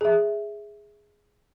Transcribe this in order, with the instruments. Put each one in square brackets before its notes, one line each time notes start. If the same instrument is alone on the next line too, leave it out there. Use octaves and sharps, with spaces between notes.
[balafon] G#4 E5